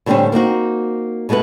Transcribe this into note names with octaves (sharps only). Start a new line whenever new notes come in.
A2 D3 G3 A#3 C4 C#4
A#3 C4 D#4 F#4
B2 G#3 A3 B3 B4